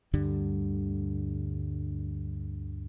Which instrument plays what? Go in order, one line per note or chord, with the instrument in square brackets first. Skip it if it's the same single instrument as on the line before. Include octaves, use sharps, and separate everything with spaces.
[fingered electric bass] D2 G2 D3 G3